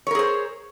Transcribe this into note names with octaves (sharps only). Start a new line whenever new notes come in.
G#4 A#4 C5 C#5